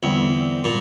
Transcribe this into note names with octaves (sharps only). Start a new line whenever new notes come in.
E2 D3 G3 C4
A#2 G3